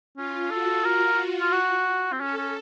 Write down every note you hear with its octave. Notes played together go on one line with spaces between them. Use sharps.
C#4 F4
F#4 A4
F#4 A#4
F4
F#4
C4
C#4 A4
C#4